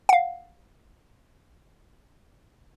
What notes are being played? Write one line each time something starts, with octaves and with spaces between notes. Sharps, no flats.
F5 F#5